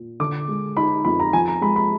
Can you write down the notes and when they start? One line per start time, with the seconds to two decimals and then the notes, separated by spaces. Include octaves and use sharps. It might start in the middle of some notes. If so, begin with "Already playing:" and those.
Already playing: A#2
0.20 D3 D6
0.48 G#3
0.77 D#4 B5
1.05 F2 B5
1.20 A#5
1.33 F3 G#5
1.48 A#5
1.61 G#3 B5
1.76 B5